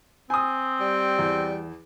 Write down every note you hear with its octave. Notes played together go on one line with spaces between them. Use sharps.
C4 G#5 D#6
G3
E2